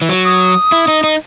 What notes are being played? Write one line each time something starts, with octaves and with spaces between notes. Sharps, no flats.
E3
F#3
D#6
E4
D#4
D#4